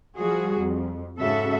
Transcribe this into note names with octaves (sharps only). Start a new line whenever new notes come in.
F3 G3 F#4 G#4
F2
G#2 C#3 F#4 A4 E5